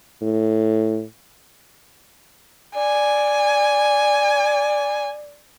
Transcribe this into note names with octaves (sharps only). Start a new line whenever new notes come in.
A2
D5 G#5